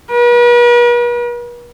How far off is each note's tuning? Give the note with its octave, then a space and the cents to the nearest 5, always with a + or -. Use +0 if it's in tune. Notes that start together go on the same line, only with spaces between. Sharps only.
B4 -45